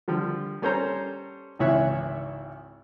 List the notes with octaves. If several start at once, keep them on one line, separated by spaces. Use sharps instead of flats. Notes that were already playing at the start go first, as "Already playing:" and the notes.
D3 F3 G3
G3 C#4 A4 C5 C#5 A#5
G#1 C#2 E3 C#5 E5 F#6